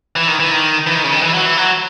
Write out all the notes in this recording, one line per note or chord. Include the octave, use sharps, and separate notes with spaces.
E3
D#3
E3
D#3
E3
D#3
C#3
D#3
E3
F#3
E3
F#3